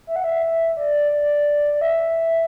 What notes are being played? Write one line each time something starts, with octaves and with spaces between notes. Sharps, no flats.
E5
F#5
E5
D5
D5
D5
E5